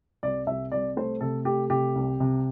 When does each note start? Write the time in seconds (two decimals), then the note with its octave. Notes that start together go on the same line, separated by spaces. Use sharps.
0.23 C2 D5
0.47 C2 E5
0.72 C2 D5
0.97 A3 C5
1.21 C3 A4
1.45 A3 G4
1.70 C3 G4
1.96 C2
2.20 C3